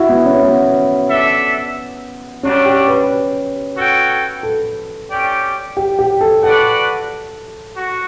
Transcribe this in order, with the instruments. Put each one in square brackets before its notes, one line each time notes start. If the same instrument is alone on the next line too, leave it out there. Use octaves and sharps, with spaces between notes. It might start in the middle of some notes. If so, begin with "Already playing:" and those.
Already playing: [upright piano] E4 F#4
B3
C#4
B3
[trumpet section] D4 A4 E5
[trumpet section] G3 D4 F#4 [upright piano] C#4
[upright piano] G4
B4
[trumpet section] F#4 A4 C#5 G5
[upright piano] A4
[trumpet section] C#4 G4 D5 G5
[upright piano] G4
G4
A4
[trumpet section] F#4 B4 D5 F#5 [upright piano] A4
[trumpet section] F#4